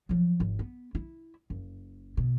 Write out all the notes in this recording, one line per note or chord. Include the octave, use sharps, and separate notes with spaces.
F3 F#3
G#1
B3
E4
F#1
B2